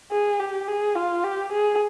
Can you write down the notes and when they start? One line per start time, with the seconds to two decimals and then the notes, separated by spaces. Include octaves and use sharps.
0.11 G#4
0.39 G4
0.68 G#4
0.95 F4
1.24 G4
1.52 G#4